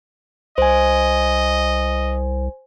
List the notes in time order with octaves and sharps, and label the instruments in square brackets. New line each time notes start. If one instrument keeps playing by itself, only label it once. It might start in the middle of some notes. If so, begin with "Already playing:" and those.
[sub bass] C2 [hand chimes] C5 G#5 [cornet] D#5